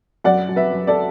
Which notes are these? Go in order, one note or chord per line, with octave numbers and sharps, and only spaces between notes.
F#2 D5 F#5
F#2
B4 E5
F#2
A4 D5